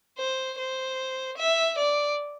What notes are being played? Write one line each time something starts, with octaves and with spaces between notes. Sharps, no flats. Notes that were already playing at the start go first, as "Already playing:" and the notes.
C5
C5
E5
D5